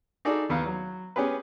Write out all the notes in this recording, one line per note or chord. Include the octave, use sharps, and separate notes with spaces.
D#4 F#4 G#4 A4 D5
D#2 B3 F5
F#3
B3 C#4 G4 G#4 B4